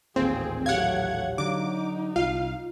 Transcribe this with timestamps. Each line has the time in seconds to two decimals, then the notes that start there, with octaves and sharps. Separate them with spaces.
0.16 A1 D#2 A#2 C4 G#4
0.66 F#3 A3 G4 C#5 F5 F#5 G#6
1.38 D3 F#3 D#4 D6
2.16 C2 F4 F5